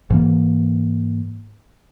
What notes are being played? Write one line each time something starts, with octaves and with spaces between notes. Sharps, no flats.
G#2 E3 A#3